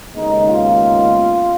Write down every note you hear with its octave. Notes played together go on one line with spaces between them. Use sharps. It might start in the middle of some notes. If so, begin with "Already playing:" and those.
D#2 C#3 G#3 B3 D#4
F4